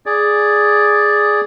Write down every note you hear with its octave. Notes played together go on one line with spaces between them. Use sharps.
G#4 D5